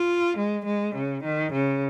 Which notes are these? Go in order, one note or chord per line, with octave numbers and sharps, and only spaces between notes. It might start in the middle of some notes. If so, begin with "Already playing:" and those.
Already playing: F4
G#3
G#3
C#3
D#3
C#3